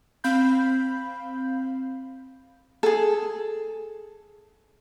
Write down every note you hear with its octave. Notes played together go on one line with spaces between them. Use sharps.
C4 F5 B5 G6
G#4 A4